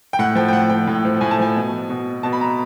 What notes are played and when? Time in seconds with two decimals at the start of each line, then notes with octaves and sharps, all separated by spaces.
0.13 G5
0.19 A2 F#5
0.35 F3 G5
0.48 G5
0.52 A2 F#5
0.70 F3 G5
0.87 A2
1.05 F3
1.21 A2 G#5
1.31 A5
1.39 F3 G#5
1.56 B2
1.90 B2
2.23 B2 A5
2.33 B5
2.41 A#5